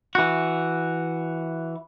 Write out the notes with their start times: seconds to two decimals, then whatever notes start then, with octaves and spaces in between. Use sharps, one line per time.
0.15 E3 F#4